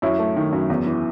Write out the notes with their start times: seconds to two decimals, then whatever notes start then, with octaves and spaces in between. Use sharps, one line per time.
0.02 F#2 C#4 E4
0.19 A3
0.36 D#3
0.53 F#2
0.70 E2
0.86 E3